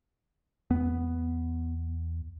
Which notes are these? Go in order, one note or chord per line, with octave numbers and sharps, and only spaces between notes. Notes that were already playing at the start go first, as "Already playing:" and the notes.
E2 B3